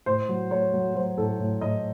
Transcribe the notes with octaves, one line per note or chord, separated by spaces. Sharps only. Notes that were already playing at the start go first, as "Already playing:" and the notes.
A2 C5
F#3
A3 C#5
F#3
F#3 C5
A2 A4
A2
A2 D#5